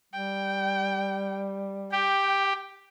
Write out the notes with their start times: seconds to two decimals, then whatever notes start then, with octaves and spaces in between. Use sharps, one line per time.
0.13 G3 G5
1.92 G4 G5